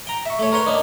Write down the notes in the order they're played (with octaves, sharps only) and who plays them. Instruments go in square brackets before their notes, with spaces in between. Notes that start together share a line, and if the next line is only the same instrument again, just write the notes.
[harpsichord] G5 A#5
E5 C#6
A3 C#5
A#4 B4 C#5 C6
A#3 D4 D#4